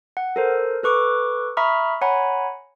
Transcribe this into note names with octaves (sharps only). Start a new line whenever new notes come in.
F#5
A4 A#4 C5
A4 B4 C#6 D6
E5 A#5 B5 C#6 D#6 F6
C#5 F#5 G#5 A#5 B5